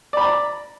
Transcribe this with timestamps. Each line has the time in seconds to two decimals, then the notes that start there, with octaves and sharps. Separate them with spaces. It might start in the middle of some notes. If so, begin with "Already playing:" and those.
0.13 D5
0.17 B5
0.21 A#5